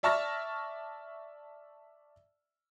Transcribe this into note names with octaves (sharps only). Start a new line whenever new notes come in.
D5 E5 A5 C#6 F6 A#6